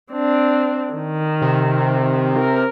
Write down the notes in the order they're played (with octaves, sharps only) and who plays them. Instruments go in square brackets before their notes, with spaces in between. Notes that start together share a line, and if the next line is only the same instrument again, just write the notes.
[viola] C4 D4
D#3
[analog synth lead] C3
[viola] A#4